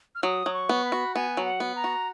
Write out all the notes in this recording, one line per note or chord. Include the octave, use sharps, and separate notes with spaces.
F6
F#3 D#6
F#3
C#6
B3
B5
F#4
B3 G#5
F#3
F#5
B3
A#5
F#4